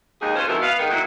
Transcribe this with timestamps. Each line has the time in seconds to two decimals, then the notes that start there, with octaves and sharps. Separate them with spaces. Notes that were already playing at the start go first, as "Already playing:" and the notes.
0.22 D#2 G#3 G#4
0.36 C#4 F4 B4 C5
0.48 F2 G#2 B2 E4 A4 A#4
0.62 B3 F5
0.79 D#3 G#3 B3
0.91 D#3 F#3 A3 A#3 E4